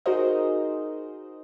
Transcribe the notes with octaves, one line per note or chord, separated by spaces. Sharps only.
D#4 F#4 G#4 A#4 C5 D#5